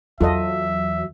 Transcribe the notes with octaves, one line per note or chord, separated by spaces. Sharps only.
E2 F#3 F4 A4 D#5 E5